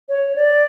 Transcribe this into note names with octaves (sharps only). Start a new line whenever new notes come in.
C#5
D5